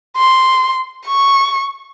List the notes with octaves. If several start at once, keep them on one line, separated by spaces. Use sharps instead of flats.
C6
C#6